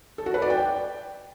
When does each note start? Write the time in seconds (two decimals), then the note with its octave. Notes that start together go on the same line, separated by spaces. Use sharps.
0.18 A4
0.26 F#4
0.34 B4
0.42 D5
0.50 G5